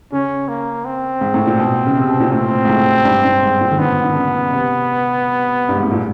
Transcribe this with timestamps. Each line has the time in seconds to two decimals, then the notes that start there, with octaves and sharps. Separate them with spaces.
0.12 C#3 C#4
0.48 A#3
0.85 C4
1.21 G#2
1.34 A2
1.47 A#2
1.59 B2
1.86 C#3
1.97 C3
2.09 B2
2.20 A#2
2.32 A2 C4
2.65 G#2
2.69 A2
3.05 G2
3.25 G2
3.43 G#2
3.61 A#2
3.71 D#3
3.79 D3 B3
4.04 D3
4.16 C#3
4.53 C3
5.69 G2
5.76 G#2
5.84 A2
5.91 A#2